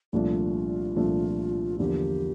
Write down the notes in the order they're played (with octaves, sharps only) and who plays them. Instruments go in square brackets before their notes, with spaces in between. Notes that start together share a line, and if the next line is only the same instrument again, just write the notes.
[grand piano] C2 A#2 F3 A3 D4 [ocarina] F4 G4
[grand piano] C2 A#2 F3 A3 D4
[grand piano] E2 D3 F3 A#3 [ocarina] G4